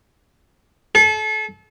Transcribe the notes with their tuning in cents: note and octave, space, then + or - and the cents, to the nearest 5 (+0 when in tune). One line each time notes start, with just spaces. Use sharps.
A4 -35